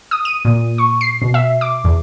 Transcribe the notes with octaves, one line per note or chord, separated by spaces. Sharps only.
D#6
D#7
A#2
C#6
C7
B2
E5
D6
E2